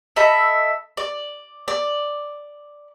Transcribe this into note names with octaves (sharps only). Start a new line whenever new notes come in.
A4 D#5 E5 B5
D5
D5